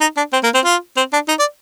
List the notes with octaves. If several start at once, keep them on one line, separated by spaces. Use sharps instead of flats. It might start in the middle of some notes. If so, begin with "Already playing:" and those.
D#4
D4
C4
A#3
C4
F4
C4
D4
D#4
D5